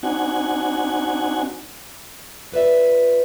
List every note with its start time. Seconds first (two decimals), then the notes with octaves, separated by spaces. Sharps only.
0.03 C4 D4 D#4 F#4 F#5 G#5
2.52 F4 B4 D5 E5